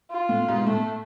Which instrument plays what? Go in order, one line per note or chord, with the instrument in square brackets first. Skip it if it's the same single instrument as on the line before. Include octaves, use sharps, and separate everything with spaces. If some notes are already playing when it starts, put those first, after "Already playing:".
[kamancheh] F4
[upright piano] A2
G#2 B2
[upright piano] A2 [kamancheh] A3